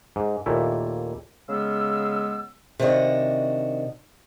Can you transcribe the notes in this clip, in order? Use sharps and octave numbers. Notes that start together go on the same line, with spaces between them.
G#2
D#2 A#2 A3 E4
C#3 G#3 B3 F5 E6
C3 D#3 D4 F#4 D#5